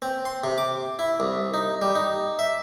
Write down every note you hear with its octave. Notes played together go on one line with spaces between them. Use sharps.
C4
C6
C3
D6
E4
C2
D#4
G3
D#4
E5